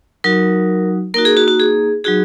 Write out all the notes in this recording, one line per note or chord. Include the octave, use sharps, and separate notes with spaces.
F#3 D#4 F#4 A#4
A#3 D#4 F#4 A#4
G#4
F#4
F#4
G#4
F#3 D#4 F#4 G#4